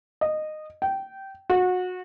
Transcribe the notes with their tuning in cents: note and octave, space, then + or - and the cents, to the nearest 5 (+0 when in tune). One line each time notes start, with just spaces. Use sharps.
D#5 -15
G5 -15
F#4 -25